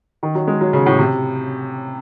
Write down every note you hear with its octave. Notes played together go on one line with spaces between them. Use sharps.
D#3
F#3
G#3
F#3
C#3
A2
C3